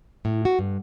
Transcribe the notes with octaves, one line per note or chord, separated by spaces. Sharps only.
A2
F#4
G2